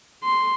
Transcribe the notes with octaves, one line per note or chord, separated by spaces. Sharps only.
C6